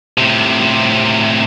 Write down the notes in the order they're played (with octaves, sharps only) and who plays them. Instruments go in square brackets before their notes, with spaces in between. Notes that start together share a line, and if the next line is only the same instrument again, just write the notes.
[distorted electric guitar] A2 C3